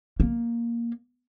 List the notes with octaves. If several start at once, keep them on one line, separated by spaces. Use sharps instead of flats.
A#3